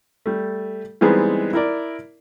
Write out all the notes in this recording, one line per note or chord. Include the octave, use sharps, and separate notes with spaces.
G3 A3
E3 G3 G#3 B3 C4 D#4
E4 A#4 D5